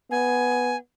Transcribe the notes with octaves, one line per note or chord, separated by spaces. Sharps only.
B3 G#5